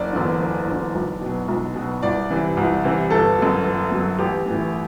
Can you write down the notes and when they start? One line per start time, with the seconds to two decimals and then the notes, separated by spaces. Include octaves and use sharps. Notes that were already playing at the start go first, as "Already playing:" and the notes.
Already playing: F#1 D5
0.13 E2 D3
0.41 F#1
0.67 E2 D3
0.95 B1
1.21 B2 F#3
1.48 B1
1.75 B2 F#3
2.02 C2 D5
2.31 C3 E3
2.57 C2
2.84 C3 E3
3.10 G1 A4
3.38 F#2 F#3
3.65 G1
3.92 F#2 F#3
4.19 A1 G4
4.46 A2 E3